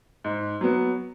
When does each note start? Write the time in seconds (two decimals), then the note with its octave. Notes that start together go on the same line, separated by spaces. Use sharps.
0.24 G#2
0.61 F#3 B3